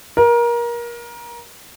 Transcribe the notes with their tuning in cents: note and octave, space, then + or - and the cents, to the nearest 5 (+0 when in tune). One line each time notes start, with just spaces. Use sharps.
A#4 +25